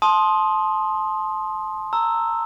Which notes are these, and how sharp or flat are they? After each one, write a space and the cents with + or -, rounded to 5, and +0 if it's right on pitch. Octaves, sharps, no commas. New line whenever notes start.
A5 -20 C6 +10 D#6 +0
A#5 -20 E6 +0